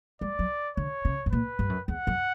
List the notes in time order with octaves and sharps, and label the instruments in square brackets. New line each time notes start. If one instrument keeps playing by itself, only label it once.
[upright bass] G3 [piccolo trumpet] D5
[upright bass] F#3
[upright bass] D3 [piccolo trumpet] C#5
[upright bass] C#3
G2
[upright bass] A#2 [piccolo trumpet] B4
[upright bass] G2
F#2
[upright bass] E2 [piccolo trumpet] F#5
[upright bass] F#2